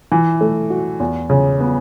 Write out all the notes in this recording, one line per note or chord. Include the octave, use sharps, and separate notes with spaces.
E3
A3
F#4
E2
C#3
B3